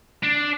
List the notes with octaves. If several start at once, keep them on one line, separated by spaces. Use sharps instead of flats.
D4